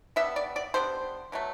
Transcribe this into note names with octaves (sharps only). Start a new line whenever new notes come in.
D3 G3 B3 E5
D5
D5
D3 G3 B3 C5
B2 F#3 A3